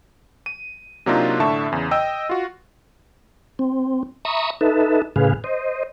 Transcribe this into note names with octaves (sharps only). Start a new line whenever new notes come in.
D#7
C3 F#3 A#3 D4 D#4 F4
A2 D3 E5 A5 C#6
E2 C#3
D#5 G5 E6
F4 F#4
C4
E5 A#5 B5 C#6 D#6
D#4 A4 B4 E5
A2 C#3 G#4 B4 F5
C5 D#5